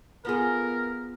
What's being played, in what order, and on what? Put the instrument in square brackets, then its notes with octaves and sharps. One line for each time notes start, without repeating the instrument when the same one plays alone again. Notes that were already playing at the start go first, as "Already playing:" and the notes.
[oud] B3 F4 G#4 [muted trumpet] A#4